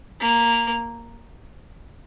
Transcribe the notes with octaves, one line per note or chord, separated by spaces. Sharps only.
A#3